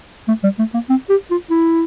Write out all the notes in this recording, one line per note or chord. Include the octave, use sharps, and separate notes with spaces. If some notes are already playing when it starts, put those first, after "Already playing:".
A3
G3
A3
A#3
C4
G4
F4
E4